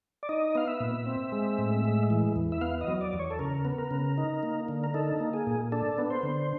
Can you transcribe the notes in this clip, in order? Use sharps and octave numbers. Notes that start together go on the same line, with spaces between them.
D5
D#4 D#5
B3 F5
E5
A#2
C4
G#3
A2
G#3
E3
E2
E5
B3 F5
D#5
F#3
D5
E2
C#5
A4
C#3 A#4
B3
A#4
C#3
D#4
A#3
D3
A#4
D#4 A4
A#3
G#4
A#2
D4 A4
B3
C5
D3